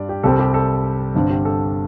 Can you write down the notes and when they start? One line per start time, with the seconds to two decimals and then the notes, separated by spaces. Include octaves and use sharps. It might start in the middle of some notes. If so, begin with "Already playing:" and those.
Already playing: G2 G3 D5
0.09 G4
0.23 C2 C3 G3 C4 A4
0.40 G4
0.54 A4
1.14 G1 G2 D3 C4
1.30 G4
1.45 A4